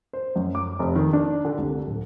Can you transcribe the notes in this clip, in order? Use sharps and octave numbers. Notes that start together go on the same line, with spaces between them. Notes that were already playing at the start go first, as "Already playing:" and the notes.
C5
F#2
D6
F1
D#3
D4
D3
C2
D1